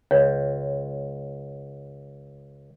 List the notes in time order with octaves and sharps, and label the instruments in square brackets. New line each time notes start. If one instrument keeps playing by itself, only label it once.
[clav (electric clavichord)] C#2 [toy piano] C#5